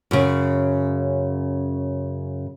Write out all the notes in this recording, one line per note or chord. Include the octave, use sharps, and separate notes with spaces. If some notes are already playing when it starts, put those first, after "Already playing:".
F#2 C#3